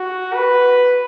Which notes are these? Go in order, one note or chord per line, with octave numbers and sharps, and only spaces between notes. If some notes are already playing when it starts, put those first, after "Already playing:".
Already playing: F#4
B4